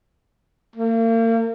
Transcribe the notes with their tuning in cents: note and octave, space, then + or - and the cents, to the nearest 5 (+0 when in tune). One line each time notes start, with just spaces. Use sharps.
A#3 -40